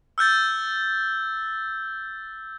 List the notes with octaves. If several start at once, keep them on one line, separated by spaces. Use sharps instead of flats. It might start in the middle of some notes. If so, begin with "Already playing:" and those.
E6 F6 G6 A6